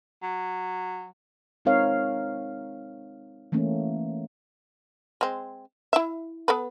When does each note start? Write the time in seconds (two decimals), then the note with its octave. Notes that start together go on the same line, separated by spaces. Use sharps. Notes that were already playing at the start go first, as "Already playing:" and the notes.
0.23 F#3
1.65 G#3 C4 D#4 A#4 C#5 F5
3.52 E3 A3 A#3 C#4
5.21 G#3 C4
5.93 E4 E5
6.48 B3 A4 B4